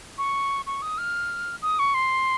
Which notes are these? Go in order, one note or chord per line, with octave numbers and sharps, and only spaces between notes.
C#6
C#6
D#6
F6
D#6
C#6
C6